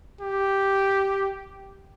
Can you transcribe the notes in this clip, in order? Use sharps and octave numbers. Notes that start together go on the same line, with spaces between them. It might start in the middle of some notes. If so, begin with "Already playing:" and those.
G4